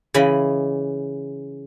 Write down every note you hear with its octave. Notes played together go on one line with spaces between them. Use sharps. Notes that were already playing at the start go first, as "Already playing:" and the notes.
C#3 E3 D#5 B5